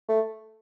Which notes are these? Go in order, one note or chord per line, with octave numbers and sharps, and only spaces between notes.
A3